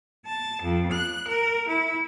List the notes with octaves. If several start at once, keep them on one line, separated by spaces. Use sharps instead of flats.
A5
F2
F#6
A#4
E4